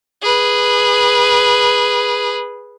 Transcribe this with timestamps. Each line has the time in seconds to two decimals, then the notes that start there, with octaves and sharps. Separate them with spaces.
0.22 G#4 B4